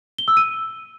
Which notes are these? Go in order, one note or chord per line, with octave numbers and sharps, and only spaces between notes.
G7
E6
D#7